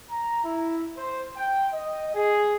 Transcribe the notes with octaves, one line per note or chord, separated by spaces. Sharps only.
A#5
E4
C5
G5
D#5
G#4